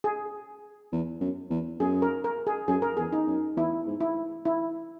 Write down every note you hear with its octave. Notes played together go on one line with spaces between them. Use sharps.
G#4
E2
F#2
E2
F#2 G#4
A#4
A#4
G#4
F#2 G#4
A#4
E2 G#4
D#4
F#2
E2 E4
G#2
E4
E4